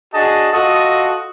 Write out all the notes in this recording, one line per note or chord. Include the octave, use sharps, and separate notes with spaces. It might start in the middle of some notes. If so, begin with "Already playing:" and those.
D4 F#4 G#4 D#5 A5
F4 F#4 A4 D#5 D#6